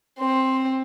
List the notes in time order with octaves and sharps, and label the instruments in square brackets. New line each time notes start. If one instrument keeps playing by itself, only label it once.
[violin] C4 [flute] C6